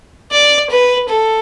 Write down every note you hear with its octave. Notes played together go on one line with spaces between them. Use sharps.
D5
B4
A4